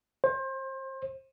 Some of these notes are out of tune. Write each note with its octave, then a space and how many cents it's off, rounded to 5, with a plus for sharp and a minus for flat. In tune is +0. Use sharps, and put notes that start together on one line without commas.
C5 +30